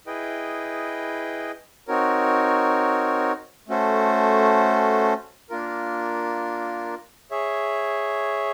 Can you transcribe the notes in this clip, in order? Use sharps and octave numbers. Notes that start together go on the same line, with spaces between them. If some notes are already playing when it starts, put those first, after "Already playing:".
E4 G#4 B4 D#5 G5
C4 D#4 F#4 A#4 C#5
A3 C#4 F#4 A4 C5
A#3 D4 F4 A#4
G#4 C#5 E5